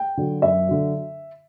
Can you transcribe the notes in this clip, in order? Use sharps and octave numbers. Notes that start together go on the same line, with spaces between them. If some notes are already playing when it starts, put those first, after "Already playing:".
Already playing: G5
D3 F#3
F#2 E5
D3 F#3